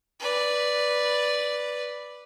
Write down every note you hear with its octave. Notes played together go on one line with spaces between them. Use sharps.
B4 D5